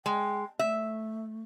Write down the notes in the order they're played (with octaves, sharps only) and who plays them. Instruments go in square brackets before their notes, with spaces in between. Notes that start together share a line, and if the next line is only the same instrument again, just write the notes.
[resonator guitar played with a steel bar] G#3 [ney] G5
[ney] A3 [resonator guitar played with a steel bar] E5